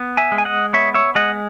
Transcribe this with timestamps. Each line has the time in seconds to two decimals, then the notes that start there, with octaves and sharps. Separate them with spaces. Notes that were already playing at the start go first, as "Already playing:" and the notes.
Already playing: B3
0.17 E5 G#5
0.32 G#3
0.38 G#5
0.45 D#5 F#5
0.73 B3 C#5 E5
0.94 C#5 E5
1.15 G#3 D#5 F#5